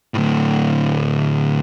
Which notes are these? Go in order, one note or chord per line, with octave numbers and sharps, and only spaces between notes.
D2 A2